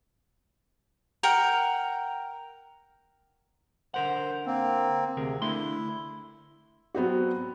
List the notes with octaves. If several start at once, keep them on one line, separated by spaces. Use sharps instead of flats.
A#4 F#5 G5
D3 A#4 C5 F#5
A#3 C4
D2 C3 G#4 A#4
D3 A3 E4 C6
F#3 B3 C4 F#4